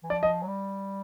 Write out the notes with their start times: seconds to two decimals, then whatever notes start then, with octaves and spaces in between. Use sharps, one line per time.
0.03 E3
0.10 F3 D5
0.23 D#5
0.42 F#3
0.48 G3